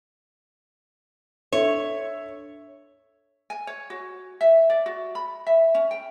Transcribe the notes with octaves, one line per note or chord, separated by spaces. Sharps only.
D4 A4 C#5 E5
G#5
C#5
F#4
E5
D5
F#4
B5
E5
C#4
G5